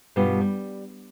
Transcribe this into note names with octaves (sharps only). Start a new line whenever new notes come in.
G2 B2 G3 F4 G4 B4
G3